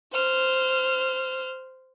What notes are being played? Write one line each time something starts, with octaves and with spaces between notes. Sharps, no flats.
C5 F6